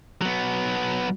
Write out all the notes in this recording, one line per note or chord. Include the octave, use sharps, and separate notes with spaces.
F#3 B3